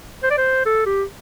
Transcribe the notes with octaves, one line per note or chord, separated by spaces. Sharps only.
C5
D5
C5
A4
G4